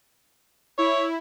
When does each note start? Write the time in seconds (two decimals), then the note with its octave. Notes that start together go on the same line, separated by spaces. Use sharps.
0.78 E4 C#5